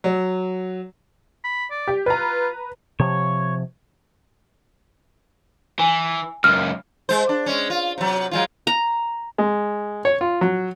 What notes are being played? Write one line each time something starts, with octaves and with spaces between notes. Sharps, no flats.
F#3
B5
D5
G4
F4 B4 A#5
C3 F3 C#5
E3 G#5
C#2 F#2 F6
G#3 C5
D4
G#3 C#4
F4
C3 F#3
F#3 G#3 F4
A#5
G#3
C#5
F4
F#3